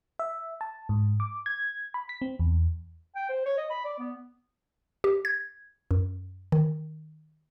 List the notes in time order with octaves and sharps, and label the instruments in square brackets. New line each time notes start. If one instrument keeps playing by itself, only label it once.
[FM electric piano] E5
A5
G#2
D6
G#6
B5
B6
C4
E2
[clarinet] G5
C5
C#5
D#5
B5
D5
B3
[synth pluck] G4
G#6
F#2
D#3